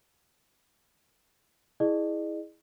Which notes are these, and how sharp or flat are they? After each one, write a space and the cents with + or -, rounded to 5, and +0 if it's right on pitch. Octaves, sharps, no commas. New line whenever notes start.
E4 -15 G#4 +0 D#5 -45